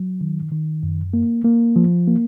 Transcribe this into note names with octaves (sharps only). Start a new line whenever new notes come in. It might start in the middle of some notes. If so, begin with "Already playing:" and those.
Already playing: F#3
D#3
D#3
F#2
A#3
A#3
F3
A#3